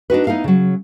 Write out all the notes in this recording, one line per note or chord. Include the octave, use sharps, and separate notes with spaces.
D4 D#4 F#4 B4
B3 D#4 E4 A4 F5
C#3 F#3